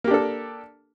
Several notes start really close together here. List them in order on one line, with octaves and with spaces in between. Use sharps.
A#3 G4 D4 A4